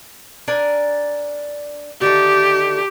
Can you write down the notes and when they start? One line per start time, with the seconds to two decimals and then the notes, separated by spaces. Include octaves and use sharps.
0.48 D4 A#4 G#5
2.01 D3 D#3 A3 G4